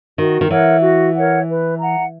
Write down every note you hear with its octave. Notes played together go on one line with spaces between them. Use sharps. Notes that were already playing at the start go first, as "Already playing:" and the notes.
D#3 F#4
D#3
E3 A#4 C#5 F#5
F#4
A#4 C#5 F#5
B4
F#5 A#5